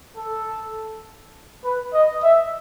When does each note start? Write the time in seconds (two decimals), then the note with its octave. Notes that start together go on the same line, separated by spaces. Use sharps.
0.17 A4
1.65 B4
1.94 D#5
2.23 E5